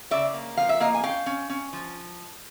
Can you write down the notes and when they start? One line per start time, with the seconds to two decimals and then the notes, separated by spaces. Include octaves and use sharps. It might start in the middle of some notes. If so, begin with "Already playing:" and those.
0.11 C#3 D5 E5
0.34 A#3
0.57 F3 F5
0.69 E5
0.80 A#3 D#5 F5
0.94 G#5
1.03 C#4 F5 G5
1.26 C#4
1.50 C#4
1.73 F3